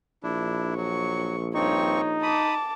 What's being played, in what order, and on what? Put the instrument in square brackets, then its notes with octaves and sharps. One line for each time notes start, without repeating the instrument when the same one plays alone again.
[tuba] A#1 [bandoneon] D4 E4
[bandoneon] F#3 [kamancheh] C#6
[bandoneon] G2 C4 C#6 [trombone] D#4 [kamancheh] C#5
[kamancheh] A5 D6 [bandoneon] B5 D#6